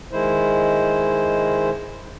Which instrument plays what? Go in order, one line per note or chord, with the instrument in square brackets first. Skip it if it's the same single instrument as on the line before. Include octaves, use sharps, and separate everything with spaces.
[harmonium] D#3 G#3 E4 C5